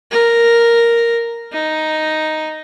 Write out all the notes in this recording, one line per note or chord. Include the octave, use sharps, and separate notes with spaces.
A#4
D#4